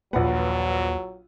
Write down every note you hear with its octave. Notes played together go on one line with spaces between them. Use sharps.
A#1 D#2 F#3 A#3 F4 B4 F#5